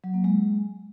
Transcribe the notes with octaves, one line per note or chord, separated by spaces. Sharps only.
F#3
A#3
G#3